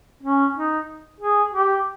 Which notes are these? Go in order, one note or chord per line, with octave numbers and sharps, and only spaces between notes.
C#4
D#4
G#4
G4